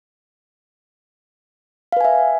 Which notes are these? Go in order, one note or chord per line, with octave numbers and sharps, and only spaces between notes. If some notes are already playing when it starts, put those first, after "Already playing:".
B4 E5 F5 G#5